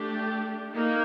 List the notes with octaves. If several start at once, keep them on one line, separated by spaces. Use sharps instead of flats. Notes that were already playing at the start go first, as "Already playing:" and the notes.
Already playing: A3 D4 G4
A#3 D#4